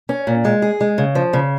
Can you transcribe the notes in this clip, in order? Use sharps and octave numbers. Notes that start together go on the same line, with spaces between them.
C#4
A#2
G#3
G#4
G#3
C#3
F3
C#3